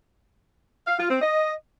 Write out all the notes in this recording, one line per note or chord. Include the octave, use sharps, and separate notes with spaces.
F5
F4
C4
D#5